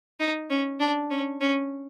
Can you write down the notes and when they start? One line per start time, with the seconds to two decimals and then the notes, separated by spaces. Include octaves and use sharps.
0.20 D#4
0.50 C#4
0.80 D4
1.11 C#4
1.41 C#4